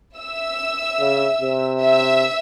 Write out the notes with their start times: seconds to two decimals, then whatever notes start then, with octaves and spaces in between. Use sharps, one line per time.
0.19 E5 E6
1.00 C#3
1.41 C3
1.81 E5 E6